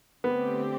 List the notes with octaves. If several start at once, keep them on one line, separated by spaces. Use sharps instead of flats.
D3 A3 B3 C4 G4